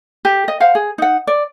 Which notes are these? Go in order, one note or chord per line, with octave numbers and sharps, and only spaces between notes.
G4
D#5
C5 F5 F#5
G#4
D#4 F#5
D5